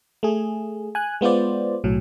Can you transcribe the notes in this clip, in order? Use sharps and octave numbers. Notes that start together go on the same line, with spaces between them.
A3 G#4
G#5 F#6
G#3 B3 F4 C5 D5
B1 A2 F#3